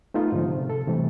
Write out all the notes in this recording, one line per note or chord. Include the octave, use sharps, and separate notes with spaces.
A3 B3 D#4 F4
G#2 D3 F3
C3
A4
C3 E3 G3 A3